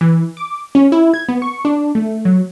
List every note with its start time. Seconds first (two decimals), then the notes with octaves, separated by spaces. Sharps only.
0.01 E3
0.37 D6
0.75 C#4
0.92 E4
1.14 G#6
1.29 B3
1.42 C#6
1.65 D4
1.95 A3
2.25 F#3